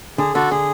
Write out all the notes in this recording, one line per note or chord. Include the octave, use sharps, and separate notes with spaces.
D3 G#4
D3 F#4 A4
D3 G#4